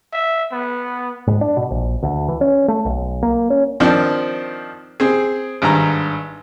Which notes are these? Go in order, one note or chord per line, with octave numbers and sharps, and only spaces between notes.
E5
B3
G#2
D4
B2
A#1
D2
E3
C#4
A3
B1
A#3
C#4
D#3 F3 C4 D4
C4 G#4
G#1 G2 A#5